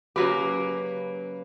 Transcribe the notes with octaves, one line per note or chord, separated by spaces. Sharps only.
C#3 F#3 A#3 G4 B4